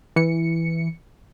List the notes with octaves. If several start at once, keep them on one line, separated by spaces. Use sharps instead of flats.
E3 C#7